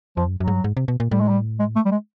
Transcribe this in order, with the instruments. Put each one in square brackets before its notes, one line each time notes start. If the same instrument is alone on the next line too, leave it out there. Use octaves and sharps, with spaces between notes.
[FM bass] F2 [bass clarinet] F3
[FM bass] F#2
[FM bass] F#2 [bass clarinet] F#3
[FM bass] G#2
G2
G#2
C3
B2
A#2
[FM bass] A2 [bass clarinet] G3
[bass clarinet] G#3
G3
G#3
A3
G3
G#3